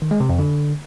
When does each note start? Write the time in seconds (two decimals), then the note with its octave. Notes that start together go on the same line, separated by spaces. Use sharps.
0.02 D#3
0.11 G#3
0.20 C3
0.29 F2
0.39 D3